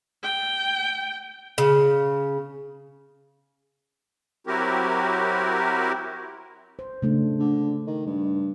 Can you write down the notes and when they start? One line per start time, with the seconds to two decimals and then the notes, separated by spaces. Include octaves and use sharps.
0.23 G5
1.58 C#3
4.47 F#3 C4 E4 F#4 G4 A#4
6.79 C5
7.02 C#3 A3 D4
7.39 D3
7.87 D#3
8.07 G2